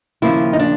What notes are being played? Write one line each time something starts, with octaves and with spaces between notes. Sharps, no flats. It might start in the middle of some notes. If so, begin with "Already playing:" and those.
D#2 C#3 F3 A#3 E4
D#4
D4